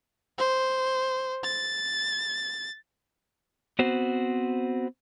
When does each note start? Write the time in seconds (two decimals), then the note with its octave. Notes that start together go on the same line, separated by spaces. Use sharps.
0.38 C5
1.44 A6
3.79 B3 C4 F#4 C5